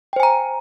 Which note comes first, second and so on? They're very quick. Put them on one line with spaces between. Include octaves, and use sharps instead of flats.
G5 C5 G#5 A#5